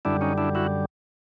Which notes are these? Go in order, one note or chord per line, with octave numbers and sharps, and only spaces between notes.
F#2 D3 G3 D4 E4
C#4 D#4
D4 E4
E4 F#4